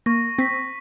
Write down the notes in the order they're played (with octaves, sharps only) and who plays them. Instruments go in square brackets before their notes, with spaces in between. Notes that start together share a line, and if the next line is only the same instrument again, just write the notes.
[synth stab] A#3 [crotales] C#6 A#6
[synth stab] C4 [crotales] A#6 B6